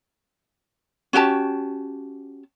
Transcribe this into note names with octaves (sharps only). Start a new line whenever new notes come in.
C#4 F#4 G4 A5